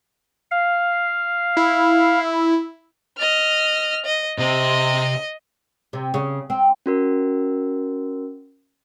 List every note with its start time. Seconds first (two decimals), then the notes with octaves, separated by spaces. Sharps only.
0.51 F5
1.57 E4
3.18 D#5 F6
4.05 D#5
4.38 C3 C4 D#5
5.93 C3
6.14 C#3
6.50 C4
6.86 C#4 F#4 A#4